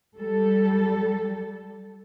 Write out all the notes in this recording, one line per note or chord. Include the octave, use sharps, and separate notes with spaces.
G3 A4